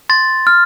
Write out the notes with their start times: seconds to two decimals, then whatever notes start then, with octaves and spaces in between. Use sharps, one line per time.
0.09 C6 A6
0.47 F6